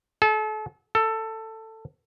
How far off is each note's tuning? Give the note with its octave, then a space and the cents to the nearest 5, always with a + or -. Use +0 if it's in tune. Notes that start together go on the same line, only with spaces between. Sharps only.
A4 -35
A4 +15